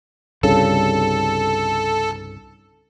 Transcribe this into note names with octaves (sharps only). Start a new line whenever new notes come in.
C2 G2 C#3 A4